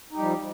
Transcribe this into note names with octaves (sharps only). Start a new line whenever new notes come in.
F3 G3 D#4 G4